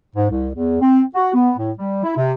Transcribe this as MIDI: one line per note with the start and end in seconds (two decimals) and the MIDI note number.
0.16 0.30 44
0.31 0.48 36
0.55 0.77 40
0.81 1.02 60
1.15 1.32 66
1.34 1.51 59
1.57 1.72 45
1.79 2.02 55
2.04 2.15 64
2.17 2.33 48